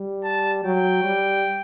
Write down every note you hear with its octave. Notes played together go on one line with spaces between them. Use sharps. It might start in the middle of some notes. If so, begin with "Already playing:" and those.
Already playing: G3
A5
F#3 G5
G3